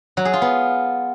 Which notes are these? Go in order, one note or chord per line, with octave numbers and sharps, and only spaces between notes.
F#3
G#4
F4
B3